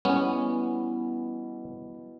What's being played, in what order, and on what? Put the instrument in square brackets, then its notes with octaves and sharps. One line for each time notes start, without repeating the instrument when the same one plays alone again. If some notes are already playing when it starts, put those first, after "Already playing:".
[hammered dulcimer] B2 E3 [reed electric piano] G3 [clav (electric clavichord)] B3 C#4